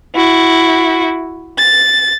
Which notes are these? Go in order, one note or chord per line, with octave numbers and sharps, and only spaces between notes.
E4 F#4
A6